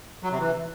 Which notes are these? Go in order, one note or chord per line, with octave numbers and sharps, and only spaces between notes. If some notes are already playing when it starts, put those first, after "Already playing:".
F#3
C3
E3